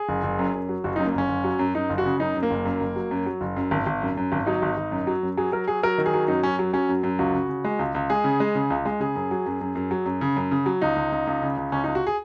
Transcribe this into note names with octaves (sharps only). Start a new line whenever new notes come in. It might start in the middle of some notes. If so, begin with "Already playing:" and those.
Already playing: G#4
F#1
F#1
F#2
F#2
F#3
F#1 F#4
D#4
F#2
A#3
F#1 C#4
F#1
F#3
F#2
F#2 D#4
F#1
F#4
C#3
F#2 D#4
F#2
A#3
F#1
F#2
F#1
F#3
F#2
F#3
F#1
F#2
G#1
G#1
F#2
F#2
G#1
F#3 D#4
G#1
G#1
F#2
F#3
F#2
F#3 G#4
F#3 A#4
F#3 G#4
F#3 A#4
D#3
G#4
F#3
F#2 D#4
F#2 C#4
F#3
F#3 C#4
F#2
F#2
C#2 F#4
C#3
C#3
G#3
C#2
C#2
G#3 G#4
C#3
G#3
C#3
C#2
G#3
C#3 G#4
F#2
F#3
F#2
F#2
F#2
F#3
F#2
C#3
F#2
C#3
F#3
C#2 D#4
C#2
C#2
C#2
C#3
C#2
C#2 C#4
D#4
C#2
F#4
G#4